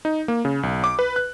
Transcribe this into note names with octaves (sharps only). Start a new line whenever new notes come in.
D#4
A#3
C#3
B1
D6
B4
F#6